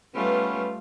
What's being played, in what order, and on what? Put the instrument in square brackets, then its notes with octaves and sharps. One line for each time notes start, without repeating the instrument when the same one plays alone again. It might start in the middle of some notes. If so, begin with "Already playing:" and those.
[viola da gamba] G3 A3 F4 [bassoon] B3 [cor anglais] C#4 [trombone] B4